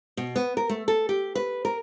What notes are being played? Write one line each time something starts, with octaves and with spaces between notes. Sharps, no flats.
B2
B3
A#4
A3
A4
G4
B4
A#4